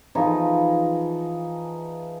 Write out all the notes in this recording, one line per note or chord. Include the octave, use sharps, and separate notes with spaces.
E3 F3 D#4 G#4